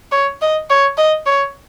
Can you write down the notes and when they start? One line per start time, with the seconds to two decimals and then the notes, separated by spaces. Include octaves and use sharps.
0.12 C#5
0.41 D#5
0.70 C#5
0.97 D#5
1.26 C#5